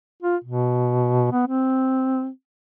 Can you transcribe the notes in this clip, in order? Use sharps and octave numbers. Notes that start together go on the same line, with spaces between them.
F4
B2
B3
C4